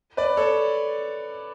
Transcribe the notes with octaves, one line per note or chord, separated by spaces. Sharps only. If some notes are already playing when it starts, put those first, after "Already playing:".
B4 D5
A4 C#5